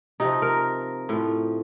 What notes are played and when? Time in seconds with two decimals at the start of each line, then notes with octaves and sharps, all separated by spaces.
0.20 C3 F3 D#4
0.42 A#4
1.09 A2 F3